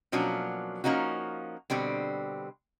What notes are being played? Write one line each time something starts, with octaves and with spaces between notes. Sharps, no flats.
B2 F3 F#3 A#3 C#4 D4
F3 A#3 C#4 D#4 F#4
B2 D3 G3 C4